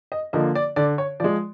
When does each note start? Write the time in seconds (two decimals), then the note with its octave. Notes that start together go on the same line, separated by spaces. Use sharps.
0.12 D#5
0.33 D3 F3 A#3 D#5
0.55 D5
0.76 D3 D5
0.98 C#5
1.20 F3 G#3 D5